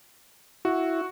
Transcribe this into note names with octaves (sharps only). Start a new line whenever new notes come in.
E4 F#4